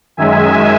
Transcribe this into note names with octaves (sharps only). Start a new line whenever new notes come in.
F#2 D#3 G#3 E5 G#5